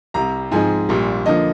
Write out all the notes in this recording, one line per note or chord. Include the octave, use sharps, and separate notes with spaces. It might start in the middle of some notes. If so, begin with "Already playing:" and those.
C2 C3 G3 A#5
G#2 F3 G#3 C4 D#4 G#5
A#1 A#2 G3
D3 F3 A#3 D#5